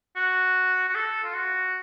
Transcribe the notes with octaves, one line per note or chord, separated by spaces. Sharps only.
F#4
F#4
A4
F4
F#4